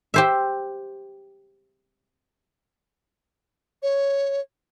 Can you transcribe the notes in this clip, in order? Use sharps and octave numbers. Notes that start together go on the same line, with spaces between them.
G4 C5 E5
C#5